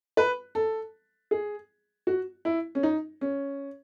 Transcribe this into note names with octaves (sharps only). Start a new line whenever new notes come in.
B4
A4
G#4
F#4
E4
C#4
D#4
C#4